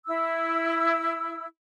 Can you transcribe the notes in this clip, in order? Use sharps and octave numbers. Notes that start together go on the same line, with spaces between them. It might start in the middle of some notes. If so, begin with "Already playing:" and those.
E4 E6